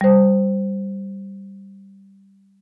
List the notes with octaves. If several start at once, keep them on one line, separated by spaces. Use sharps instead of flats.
G3 C5